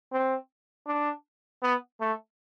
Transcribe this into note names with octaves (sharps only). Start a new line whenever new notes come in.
C4
D4
B3
A3